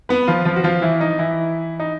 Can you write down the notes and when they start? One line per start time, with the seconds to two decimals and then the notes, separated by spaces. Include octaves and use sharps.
0.09 B3 B4
0.28 F3 F4
0.45 F3 F4
0.56 F#4
0.64 F3 F4
0.82 E3 E4
1.01 D#4
1.19 E3 E4
1.80 D#4